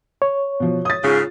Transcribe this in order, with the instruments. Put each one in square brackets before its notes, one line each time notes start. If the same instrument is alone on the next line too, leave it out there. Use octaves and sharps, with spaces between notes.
[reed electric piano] C#5
[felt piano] B2 F3
D#6 A6
[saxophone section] G#2 C#3 [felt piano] F4